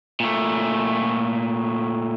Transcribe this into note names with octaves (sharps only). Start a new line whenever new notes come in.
A#2 A3